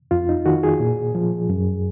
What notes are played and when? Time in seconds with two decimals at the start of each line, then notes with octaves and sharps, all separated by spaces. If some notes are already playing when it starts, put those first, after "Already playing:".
0.11 F2 F4
0.29 D#4
0.46 D#3 F#4
0.63 G#4
0.80 A#2
1.15 F3
1.49 F#2